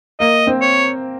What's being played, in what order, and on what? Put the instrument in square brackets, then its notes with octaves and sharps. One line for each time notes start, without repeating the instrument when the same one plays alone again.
[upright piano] A#3 [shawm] D#5
[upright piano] C4
[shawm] C#5